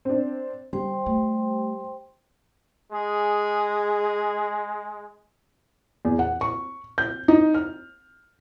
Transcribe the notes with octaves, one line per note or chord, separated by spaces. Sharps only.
C4 D4
D3 G3 C5 G5 C6
A3
G#3 G#4
E2
F#5
C#6
G6
D#4
F6